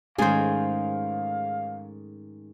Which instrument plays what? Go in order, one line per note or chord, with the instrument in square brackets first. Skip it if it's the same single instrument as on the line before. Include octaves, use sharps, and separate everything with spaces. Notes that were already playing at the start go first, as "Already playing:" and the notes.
[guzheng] G#2 D#3 [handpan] G#3 A3 C#4 [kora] G#4 C5 [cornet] F5